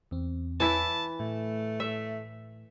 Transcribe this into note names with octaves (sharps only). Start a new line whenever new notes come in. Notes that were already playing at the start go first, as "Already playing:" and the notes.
E2 C4
E3 E4 A5
A2 A3
E5